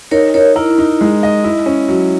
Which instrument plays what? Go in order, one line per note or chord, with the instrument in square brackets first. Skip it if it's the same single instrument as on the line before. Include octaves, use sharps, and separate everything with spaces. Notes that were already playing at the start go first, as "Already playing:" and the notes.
[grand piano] D#4 [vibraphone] A#4 C#5
[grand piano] D#4 [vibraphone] A#4 C#5
[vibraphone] E4 [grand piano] A#4
[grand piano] D#4
G#3
D#5
E4
C#4
F#3